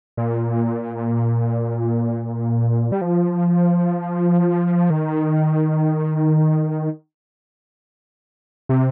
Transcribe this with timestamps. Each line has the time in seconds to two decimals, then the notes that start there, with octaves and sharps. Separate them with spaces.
0.17 A#2
2.92 G3
3.01 F3
4.90 D#3
8.69 C3